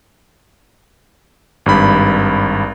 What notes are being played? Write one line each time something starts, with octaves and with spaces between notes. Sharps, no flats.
G#1 G2 B5